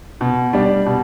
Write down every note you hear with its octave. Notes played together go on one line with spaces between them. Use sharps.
B2
G3 D4
B2